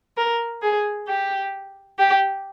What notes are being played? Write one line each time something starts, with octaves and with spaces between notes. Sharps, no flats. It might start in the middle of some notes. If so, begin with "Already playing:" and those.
A#4
G#4
G4
G4